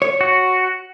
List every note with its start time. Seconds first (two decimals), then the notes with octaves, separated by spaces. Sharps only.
0.02 C#5
0.21 F#4